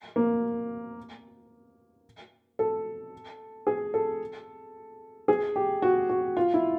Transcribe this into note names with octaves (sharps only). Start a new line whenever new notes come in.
A#3
A4
G#4
A4
G#4
G4
F#4
F#4
F4
E4